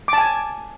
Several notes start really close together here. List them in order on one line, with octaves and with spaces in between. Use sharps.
D6 A5 G#5